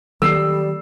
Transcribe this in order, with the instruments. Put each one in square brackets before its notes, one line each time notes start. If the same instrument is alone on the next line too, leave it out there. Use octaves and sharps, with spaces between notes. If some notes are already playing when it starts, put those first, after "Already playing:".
[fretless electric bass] D#3 F#3 A#3 [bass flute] G3 [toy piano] A4 [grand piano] E6 C7